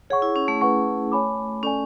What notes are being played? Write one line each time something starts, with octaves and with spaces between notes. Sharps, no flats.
G#4 C#5 F#5 C#6
E4
C#4
A3
A3 B4 F#5 C#6
C#5 G#5 B5 D6
C#4 A4 D5 G#5